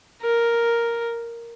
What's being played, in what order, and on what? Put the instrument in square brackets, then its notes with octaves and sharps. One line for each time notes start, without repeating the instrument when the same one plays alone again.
[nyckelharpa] A#4